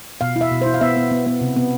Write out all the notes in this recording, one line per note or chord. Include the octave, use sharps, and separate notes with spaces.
B2 F5
E4
E5
B2
E4 C5
F5
B3 E5
B3
B3
B3
C3
B3